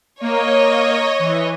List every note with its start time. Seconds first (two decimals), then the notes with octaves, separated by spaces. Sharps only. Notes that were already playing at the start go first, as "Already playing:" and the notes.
0.21 A#3 C#5 D#5
1.19 E3